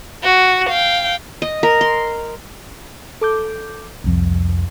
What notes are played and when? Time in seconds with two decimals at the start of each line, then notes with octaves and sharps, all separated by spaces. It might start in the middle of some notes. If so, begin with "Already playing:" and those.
0.24 F#4
0.69 F5 G5
1.42 D#5
1.63 A#4
1.81 C6
3.21 A4 D6 G6
4.04 C2 F2